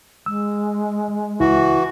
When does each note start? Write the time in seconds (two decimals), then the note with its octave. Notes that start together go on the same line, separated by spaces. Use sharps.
0.26 G#3 E6
1.40 C#2 E3 E4 F#4